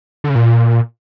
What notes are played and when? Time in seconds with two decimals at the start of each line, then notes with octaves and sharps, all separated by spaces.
0.24 D3
0.30 C#3
0.35 A#2